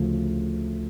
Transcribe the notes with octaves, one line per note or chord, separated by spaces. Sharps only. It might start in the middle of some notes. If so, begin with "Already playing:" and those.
Already playing: D2 C#3 F3 A3